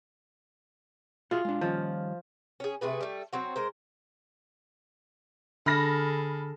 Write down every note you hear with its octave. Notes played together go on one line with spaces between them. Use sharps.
F4 F#4 G#4 E5
G#3 D4
D#3 F3 G3 C#4
C#4 G#4
C3 A3 G#4 B4
G3 A3
F#3 C4 F#4
G#3 A#4 C5
D3 G#4 A4 B5 F6 A#6